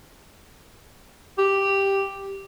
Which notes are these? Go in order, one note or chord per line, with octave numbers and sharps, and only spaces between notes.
G4